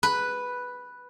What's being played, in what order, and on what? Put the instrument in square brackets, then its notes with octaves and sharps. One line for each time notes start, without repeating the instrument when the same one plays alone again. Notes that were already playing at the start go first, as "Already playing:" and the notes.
[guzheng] B4